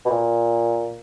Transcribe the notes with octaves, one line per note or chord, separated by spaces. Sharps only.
B2
A#2